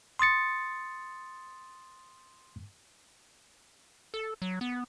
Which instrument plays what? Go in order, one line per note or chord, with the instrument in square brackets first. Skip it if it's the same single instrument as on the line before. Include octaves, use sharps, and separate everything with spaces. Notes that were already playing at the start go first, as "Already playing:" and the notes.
[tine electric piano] C6 D#6 A6 C#7
[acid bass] A4
F#3
B3